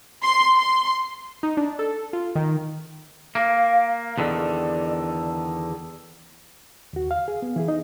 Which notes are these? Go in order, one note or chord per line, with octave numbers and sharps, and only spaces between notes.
C6
C6
D#4
D4
A4
F4
D#3
A#3 F5
E2 D3 D#3 D5
D#2 F#4
F5
G#4
B3
E3 E4 G#4
D#4 D#5